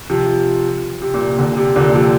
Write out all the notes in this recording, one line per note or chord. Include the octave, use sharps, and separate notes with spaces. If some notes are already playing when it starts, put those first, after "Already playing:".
C3 F3
C3
A#2
C3
A#2 D3
C3
A#2 D3
C3 F3